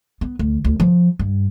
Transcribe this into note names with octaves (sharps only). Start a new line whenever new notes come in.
B3
D2
D2
F3
G2